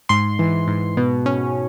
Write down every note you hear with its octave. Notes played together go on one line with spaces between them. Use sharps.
G#2 C6
E3
G#2
B2
C#4